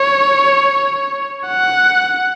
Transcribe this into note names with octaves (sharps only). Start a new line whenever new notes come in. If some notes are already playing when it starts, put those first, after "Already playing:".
Already playing: C#5
F#5